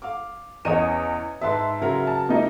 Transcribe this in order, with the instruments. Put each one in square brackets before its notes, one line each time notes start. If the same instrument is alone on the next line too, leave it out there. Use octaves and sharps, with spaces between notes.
[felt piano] F5 D6
[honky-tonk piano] E2 D#5 D#6 [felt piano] C#4 C#5 D#7
[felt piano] G#2 B4 A5 [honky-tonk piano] E5 C6
[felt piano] C#3 F#3 A#4
[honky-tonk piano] A5
A#3 D#4 E4